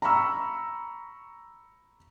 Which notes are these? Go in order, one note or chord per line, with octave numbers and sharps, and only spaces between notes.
A#5 B5 C#6 E6